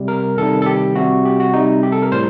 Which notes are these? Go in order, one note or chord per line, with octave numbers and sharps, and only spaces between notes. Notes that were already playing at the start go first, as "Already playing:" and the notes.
Already playing: C3 G3
A#4
C3 D#3 G3 A4
A4
G4
C3 G3 F#4
G4
F#4
C3 G3 D#4
G4
A4
A#4
A2 G3 C5